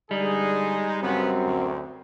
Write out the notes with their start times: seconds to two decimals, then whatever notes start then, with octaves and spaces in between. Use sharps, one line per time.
0.11 D3 G3 G#3 D#4 G#4
1.03 F#2 C#3 G#3 B3 C4
1.45 D2